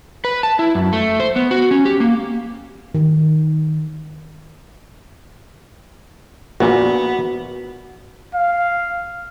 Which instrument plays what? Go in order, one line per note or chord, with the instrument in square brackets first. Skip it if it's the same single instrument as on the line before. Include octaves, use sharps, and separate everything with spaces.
[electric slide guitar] B4
A5
E4
F#2
A3
C5
B3
F#4
C#4
G4
A#3
[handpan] D#3
[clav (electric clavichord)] A#1 A#2 [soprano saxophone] B3 [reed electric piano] F#4
[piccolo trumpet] F5